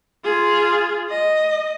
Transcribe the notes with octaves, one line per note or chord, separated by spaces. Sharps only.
F4 G#4
D#5